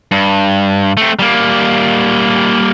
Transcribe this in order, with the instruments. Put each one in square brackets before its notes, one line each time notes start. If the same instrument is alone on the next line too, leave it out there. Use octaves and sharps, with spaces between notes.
[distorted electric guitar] G2
A3 C4
G3 A#3